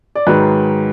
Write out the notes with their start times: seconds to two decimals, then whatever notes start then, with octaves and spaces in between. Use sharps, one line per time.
0.15 D5
0.27 G#2 D#3 F#3 B4